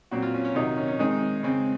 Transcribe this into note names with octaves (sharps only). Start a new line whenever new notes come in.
A#2 F#3 C4 F#4
F4
C#4
C#4
C3 D#3 F#3 D#4
C#4
C#4
D#3 G#3 C4 D#4
C#3 G#3 C4